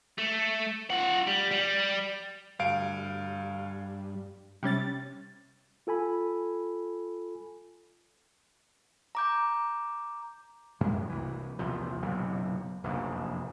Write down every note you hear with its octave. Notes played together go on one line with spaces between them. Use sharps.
A3
F4 F#5
G3
G3
D2 G2 F5 D7
C3 G3 C#4 A6
F4 A4 G#5 B5
A#5 D6 G6
F#2 A2 C#3 G#3
C2 E3
A#1 E2 C3 F3
F#1 B1 C3
F1 A#1 F#2 C#3